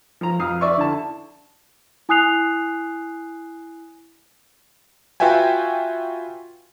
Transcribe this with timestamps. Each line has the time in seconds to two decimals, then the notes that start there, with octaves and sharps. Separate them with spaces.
0.21 F3 A#5
0.39 F2 F5 D#6
0.61 D5 E5 C#6
0.78 D3 E4 A5
2.09 E4 G#5 D#6 F#6 C7 F7
5.20 F4 F#4 B4 E5 G5 G#5